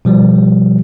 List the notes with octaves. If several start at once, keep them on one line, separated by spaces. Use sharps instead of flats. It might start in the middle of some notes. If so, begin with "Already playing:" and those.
B2 F3 G3